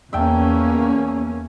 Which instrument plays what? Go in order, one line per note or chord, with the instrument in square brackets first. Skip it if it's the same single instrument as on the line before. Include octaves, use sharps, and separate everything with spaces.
[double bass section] E2 A#3 C#4 [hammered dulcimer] E5 G5 A5